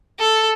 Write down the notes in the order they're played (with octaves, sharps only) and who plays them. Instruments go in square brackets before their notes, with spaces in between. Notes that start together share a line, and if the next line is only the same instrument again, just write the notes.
[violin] A4